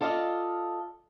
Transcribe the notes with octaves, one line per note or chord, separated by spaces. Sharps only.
F4 A4 D5 D#5 F5